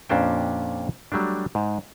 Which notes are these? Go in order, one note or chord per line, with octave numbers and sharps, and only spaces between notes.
F2 A#2 C#4 D4 C5 G5
F#3 G3 A3 D4
G#2